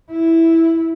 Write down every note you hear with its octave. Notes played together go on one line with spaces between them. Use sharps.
E4